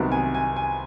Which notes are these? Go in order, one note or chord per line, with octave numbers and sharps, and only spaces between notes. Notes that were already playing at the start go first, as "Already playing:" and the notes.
Already playing: C2 C3 D#3 F#3 B3
G#5
G#5
G#5